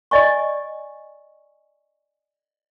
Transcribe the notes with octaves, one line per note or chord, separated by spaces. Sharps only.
D5 D#5 G#5 C#6